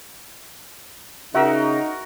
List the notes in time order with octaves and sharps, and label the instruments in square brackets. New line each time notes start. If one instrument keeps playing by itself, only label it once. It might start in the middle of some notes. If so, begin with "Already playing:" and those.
[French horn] C#3 [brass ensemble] D#4 [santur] F#4 A#4 [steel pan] E5